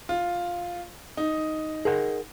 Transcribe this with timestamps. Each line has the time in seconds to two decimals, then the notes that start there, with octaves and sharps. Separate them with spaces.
0.09 F4
1.17 D#4
1.85 G#4 A#4 F#5